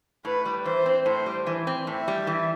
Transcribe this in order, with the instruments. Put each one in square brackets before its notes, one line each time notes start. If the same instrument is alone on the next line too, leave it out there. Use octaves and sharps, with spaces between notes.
[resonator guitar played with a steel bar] A2 [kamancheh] B4
[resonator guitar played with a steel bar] G3
[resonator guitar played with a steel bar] E3 [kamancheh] C5
[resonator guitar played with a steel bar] C4
[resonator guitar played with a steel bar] A2 [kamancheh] C5
[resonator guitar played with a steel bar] G3
E3
C4
[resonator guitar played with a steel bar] A2 [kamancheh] E5
[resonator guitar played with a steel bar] G3
E3